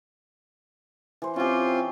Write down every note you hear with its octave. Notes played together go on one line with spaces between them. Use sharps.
E3 C5
C4 C#4 F4 G4